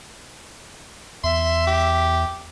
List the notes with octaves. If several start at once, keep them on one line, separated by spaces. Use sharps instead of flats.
E2 E5 C6
G4